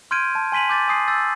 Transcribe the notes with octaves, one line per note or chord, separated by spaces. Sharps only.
C6 F6 G6 G#6 D7 D#7
A5
G#5 C6 B6 D#7 F#7
D6 G6 A6
G#5 D#6 C7
E6 G6 A6